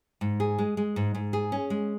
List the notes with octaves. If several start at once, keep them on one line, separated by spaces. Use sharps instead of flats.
G#2
G#4
G#3
G#3
G#2
G#2
G#4
C#4
G#3